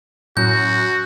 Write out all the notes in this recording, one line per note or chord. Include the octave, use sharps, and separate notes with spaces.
F#2 A2 F#4 G6